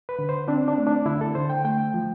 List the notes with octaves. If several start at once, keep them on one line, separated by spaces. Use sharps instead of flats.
B4
D3
C5
C4 D4
D4
A3
D4
D3 E4
A4
D3 C5
G5
A3 G5
F3